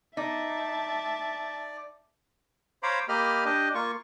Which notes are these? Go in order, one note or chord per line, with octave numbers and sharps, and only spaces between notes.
D#4 D5 E5 A5
C5 C#5 F5 A#5 B5 D6
A#3 G4 D#5 B5 F6
D4 G4 D#5
A#3 F4 C#6